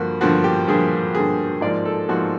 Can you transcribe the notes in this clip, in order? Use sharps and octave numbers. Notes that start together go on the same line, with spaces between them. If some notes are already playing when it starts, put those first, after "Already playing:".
Already playing: G2 D3 F3 A#3 F#4
G2 D3 F3 A#3 F#4
G4
G2 D3 F3 A#3 G#4
G2 D3 F3 A#3 G#4
G#2 F3 A#3 D5
A4
G#2 F3 A#3 F#4